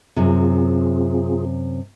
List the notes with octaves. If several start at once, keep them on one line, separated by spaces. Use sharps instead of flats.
F#2 C3 C4 F4 G#4